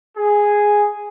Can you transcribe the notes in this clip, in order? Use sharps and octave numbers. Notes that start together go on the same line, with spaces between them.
G#4